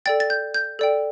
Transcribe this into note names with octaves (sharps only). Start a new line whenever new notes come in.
A4 D5 G5 A6
A6
G6
G6
A4 D5 G5